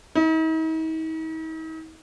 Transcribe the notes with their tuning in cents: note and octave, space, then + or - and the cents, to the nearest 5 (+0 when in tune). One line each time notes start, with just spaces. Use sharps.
D#4 +45